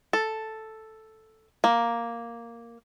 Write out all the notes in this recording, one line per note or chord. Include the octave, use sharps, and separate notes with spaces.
A4
A#3